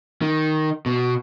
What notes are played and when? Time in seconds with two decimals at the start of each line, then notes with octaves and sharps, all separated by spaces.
0.22 D#3
0.86 B2